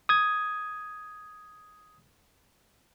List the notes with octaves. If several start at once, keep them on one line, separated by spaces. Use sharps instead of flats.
D#6 G#6